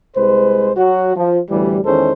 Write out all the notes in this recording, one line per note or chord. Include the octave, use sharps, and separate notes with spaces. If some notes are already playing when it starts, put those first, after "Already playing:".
C2 G#3 B4 C5
F#3 F#4
F3
A1 D2 E3 G3
E2 D#3 G#3 C#4 A4 C5